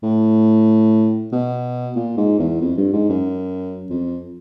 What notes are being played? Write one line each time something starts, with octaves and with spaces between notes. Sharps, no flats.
A2
B2
A#2
G#2
E2
F2
G2
G#2
F#2
F2